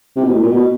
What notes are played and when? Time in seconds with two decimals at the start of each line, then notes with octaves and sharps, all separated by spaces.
0.16 C3
0.24 B2
0.33 A2
0.43 A#2
0.51 B2